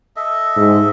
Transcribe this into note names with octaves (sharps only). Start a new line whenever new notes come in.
A4 D#5 E5
G#2